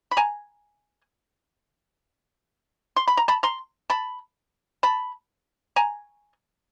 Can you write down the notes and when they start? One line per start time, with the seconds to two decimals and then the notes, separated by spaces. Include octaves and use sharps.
0.11 B5
0.17 G#5 A#5
2.96 C6
3.08 B5
3.17 A#5
3.28 A5 B5
3.43 A#5 C6
3.90 A5 B5
4.83 A5 B5
5.76 G#5 A#5